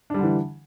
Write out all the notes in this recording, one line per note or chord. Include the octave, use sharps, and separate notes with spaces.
D3 E3 G3 D4